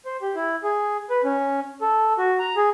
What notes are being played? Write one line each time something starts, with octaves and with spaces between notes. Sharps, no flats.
C5
G4
E4
G#4
B4
C#4
A4
F#4
A#5
G#4